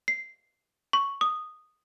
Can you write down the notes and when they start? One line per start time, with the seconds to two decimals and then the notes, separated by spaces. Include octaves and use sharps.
0.08 C7
0.93 C#6
1.21 D#6